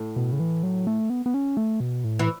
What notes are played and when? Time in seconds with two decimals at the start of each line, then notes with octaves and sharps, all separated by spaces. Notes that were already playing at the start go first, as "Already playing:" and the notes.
Already playing: A2
0.16 B2
0.32 C#3
0.40 E3
0.63 F#3
0.87 A3
1.10 B3
1.26 B3
1.34 C#4
1.57 A3
1.80 B2
2.04 A2
2.19 E3